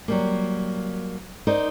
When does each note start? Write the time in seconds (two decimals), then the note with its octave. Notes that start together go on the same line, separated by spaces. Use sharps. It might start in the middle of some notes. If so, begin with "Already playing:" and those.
0.08 F#3 G3 A#3
1.47 D#4 A#4 C5 D5